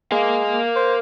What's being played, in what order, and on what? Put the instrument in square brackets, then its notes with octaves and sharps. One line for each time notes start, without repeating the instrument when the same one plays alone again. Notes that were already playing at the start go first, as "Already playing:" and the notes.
[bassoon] G#3 [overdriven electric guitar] A#4 F5
[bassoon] C5